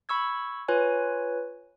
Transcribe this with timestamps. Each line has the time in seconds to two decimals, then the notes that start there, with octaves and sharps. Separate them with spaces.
0.09 B5 C#6 E6 G#6
0.68 F4 B4 C#5 G#5